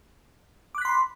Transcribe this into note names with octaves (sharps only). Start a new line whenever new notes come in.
B5 C6 D6 F#6 B6